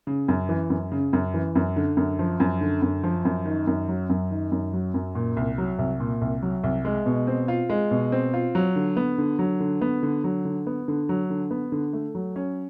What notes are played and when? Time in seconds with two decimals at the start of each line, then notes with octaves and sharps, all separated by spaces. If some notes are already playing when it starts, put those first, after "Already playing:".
0.07 C#3
0.28 F#2
0.49 E3
0.70 F#2
0.92 C#3
1.13 F#2
1.34 E3
1.55 F#2
1.76 D3
1.97 F#2
2.19 F3
2.40 F#2
2.61 D3
2.82 F#2
3.04 F3
3.25 F#2
3.46 D#3
3.67 F#2
3.89 F#3
4.10 F#2
4.31 D#3
4.52 F#2
4.73 F#3
4.94 F#2
5.15 A#2
5.37 C2
5.58 F#3
5.78 C2
6.00 A#2
6.21 C2
6.42 F#3
6.63 C2
6.85 G#3
7.06 B2
7.27 C4
7.48 F4
7.70 G#3
7.91 B2
8.12 C4
8.34 F4
8.55 F#3
8.76 D3
8.97 B3
9.18 D3
9.39 F#3
9.60 D3
9.81 B3
10.03 D3
10.24 F#3
10.45 D3
10.67 B3
10.88 D3
11.09 F#3
11.30 D3
11.51 B3
11.72 D3
11.93 A3
12.15 F#3
12.36 C#4